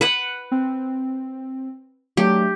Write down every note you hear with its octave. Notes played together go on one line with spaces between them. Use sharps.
B4 F#5 B5
C4
F#3 A3 D4 G4